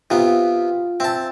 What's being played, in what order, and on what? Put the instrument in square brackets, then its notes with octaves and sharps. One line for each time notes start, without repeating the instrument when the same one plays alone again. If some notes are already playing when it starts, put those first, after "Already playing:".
[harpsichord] C3 B3 [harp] F4
[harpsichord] C4 A5 [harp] E5